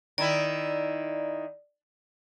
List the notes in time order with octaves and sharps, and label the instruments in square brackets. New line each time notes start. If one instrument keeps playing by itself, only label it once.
[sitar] D#3 E4 [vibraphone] D5